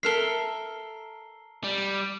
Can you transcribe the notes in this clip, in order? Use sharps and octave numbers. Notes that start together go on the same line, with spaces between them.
A4 A#4 E5 C7 G7
G3